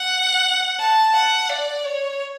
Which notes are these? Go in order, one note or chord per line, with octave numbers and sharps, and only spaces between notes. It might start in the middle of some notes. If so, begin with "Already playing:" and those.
Already playing: F#5
A5
F#5
D5
C#5